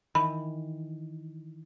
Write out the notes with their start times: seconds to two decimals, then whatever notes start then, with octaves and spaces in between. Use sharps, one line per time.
0.15 D#3 E3 B5